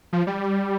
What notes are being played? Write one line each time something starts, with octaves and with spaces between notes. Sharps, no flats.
F3
G3